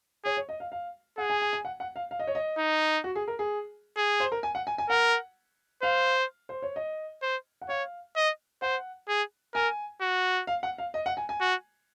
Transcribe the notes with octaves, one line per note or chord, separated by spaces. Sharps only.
G#4 C#5
C#5
D#5
F5
F5
G#4 F#5
G#5
G#5
G#5
F#5
F#5
F5
F5
D#5
C#5
D#5
D#4
F#4
G#4
A#4
G#4
G#4
C5
A#4
G#5
F#5
G#5
G#5
A#4 F#5
C5 F5
C5
C#5
D#5
C5
F#5
C#5 F5
D#5
C5 F#5
G#4
A#4 G#5
F#4
F5
F#5
F5
D#5
F#5
G#5
G#5
F#4